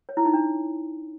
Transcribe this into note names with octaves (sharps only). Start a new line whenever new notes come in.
C#5
E4
D#4
D4